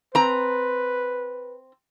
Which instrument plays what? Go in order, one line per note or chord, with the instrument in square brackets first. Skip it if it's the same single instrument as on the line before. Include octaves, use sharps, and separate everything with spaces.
[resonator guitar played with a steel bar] C4 A#5 [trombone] B4